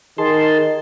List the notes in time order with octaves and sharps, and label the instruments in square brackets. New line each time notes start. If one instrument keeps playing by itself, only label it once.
[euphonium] D#3 [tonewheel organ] G#4 A5 C6